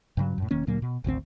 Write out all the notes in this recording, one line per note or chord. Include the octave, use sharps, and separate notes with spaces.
G2 C#3 F#3
F#2 A2
E1 D#3 A#3 C#4
D2 A#2 F#3 A#3
B2
G#1 D2 D#3 C4